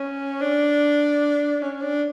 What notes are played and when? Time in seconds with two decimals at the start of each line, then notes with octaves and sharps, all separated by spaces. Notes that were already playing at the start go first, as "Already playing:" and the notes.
Already playing: C#4
0.41 D4
1.62 C#4
1.82 D4